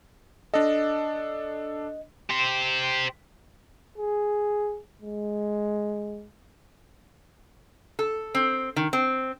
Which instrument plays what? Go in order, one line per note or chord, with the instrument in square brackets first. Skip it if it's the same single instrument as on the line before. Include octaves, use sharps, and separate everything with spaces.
[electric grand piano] D4 A4 [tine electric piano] D#5
[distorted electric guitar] G4 C5
[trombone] G#4
G#3
[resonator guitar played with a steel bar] A4
C4
D#3
C4